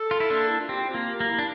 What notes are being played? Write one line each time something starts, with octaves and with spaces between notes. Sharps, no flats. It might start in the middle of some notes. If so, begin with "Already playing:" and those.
Already playing: A4
F4
E4
A#3 D4
E4
F4
C4 G4
E4
F4
A#3
G4
A#3
E4
D4